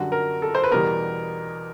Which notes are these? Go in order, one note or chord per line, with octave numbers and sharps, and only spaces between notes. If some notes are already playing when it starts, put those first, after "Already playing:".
Already playing: F#2 D3 G3 F#4
A#4
A4
C5
B4
E2 B2 G3 B3 A#4